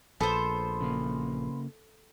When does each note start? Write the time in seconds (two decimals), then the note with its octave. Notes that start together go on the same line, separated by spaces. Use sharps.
0.21 A#1 B3 A4 C5
0.81 C#3 A#3